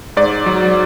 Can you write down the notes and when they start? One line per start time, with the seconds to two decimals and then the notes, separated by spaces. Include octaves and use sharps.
0.17 G#2 D5
0.46 F#3